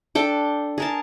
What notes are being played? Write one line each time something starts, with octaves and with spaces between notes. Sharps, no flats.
D4 A4 G5
G#4 A#4 A5